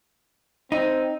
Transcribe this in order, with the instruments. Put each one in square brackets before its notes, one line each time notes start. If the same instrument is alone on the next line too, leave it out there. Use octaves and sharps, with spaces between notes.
[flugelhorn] C4 [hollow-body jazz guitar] D#4